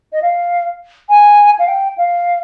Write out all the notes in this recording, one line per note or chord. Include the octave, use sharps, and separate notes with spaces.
D#5
F5
G#5
F5
G5
F5